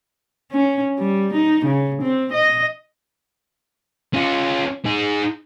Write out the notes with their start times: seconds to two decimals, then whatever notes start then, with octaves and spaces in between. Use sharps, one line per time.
0.51 C#4
0.98 G3
1.34 D#4
1.65 C#3
2.02 C4
2.33 D#5
4.14 C#4 F4
4.86 D#4 G#4